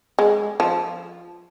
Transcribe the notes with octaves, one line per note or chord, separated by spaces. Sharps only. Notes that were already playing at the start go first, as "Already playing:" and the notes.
G#3
F3